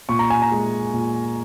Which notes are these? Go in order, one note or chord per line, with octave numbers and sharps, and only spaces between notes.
A#2 C#6
A#5
G#5
A#5
G#3
A#2